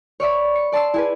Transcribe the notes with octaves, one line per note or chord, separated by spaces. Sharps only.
C#5 D5 E5 B5
C#7
D5 A5 C6 E6 C7
E4 G#4 B4